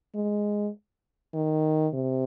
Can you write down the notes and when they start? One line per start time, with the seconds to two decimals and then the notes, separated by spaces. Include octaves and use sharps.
0.15 G#3
1.34 D#3
1.94 C3